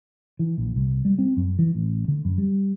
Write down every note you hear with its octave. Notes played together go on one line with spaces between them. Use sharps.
E3
A#1
C2
G3
C4
F#2
E3
A1
D3
F#2
G3